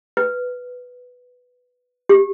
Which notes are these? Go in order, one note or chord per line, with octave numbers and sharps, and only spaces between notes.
B4
G4